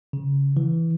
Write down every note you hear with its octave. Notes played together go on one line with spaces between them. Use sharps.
C#3
E3